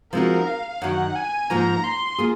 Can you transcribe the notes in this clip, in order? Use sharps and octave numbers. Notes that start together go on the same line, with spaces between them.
F3 G#3 C4 D#4 F#4 A#4
F5
F#2 D#3 F#3 F#5
G#5
G#2 F3 A#3 A#5
C6
A#3 F4 G#4